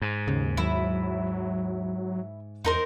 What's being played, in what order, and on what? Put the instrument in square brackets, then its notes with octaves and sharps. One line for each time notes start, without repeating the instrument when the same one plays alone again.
[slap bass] G#2
[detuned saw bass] D#2 [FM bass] C#3
[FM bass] D#2 [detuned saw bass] F#3 [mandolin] E4
[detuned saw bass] E2 [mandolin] D#4 A#4 C5